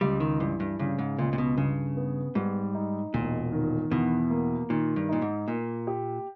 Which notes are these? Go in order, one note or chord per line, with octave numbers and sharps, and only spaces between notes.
C#2 G3
D#3
G2 E3
G2
G2 C#3
G#2
C#2 A#2
A#2
B2
G2 C#3
B3
G#2 G3
D#4
E1 A#2
D#3
E2 B2
A#3
A#2 D#3
G2
A#2 D#4
G#2
A#2 A#3
G4